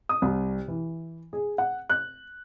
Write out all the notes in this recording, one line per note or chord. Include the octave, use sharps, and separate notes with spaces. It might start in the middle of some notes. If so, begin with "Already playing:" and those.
D#6
C2
E3
G#4
F#5
F#6